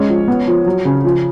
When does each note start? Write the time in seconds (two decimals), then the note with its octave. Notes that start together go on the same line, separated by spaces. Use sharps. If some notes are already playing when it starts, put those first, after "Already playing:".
Already playing: G#3 C#4 C#5
0.09 F3
0.28 B3
0.47 F3
0.66 F#3
0.85 C#3
1.04 F3